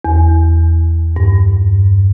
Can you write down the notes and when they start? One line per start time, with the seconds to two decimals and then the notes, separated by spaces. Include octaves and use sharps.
0.05 E2
1.16 G2